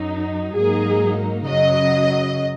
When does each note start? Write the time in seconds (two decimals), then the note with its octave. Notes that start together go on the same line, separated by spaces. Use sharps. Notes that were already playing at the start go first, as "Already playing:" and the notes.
Already playing: F#2 F#3 D#4
0.56 G#2 F#3 A#3 D#4 G#4
1.47 F#2 C#3 F#3 D#5